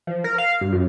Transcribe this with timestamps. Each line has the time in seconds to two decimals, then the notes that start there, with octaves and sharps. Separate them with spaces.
0.07 F3
0.24 A#4
0.38 F5
0.61 G2
0.73 F#2